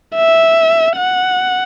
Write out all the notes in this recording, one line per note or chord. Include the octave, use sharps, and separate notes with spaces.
E5
F#5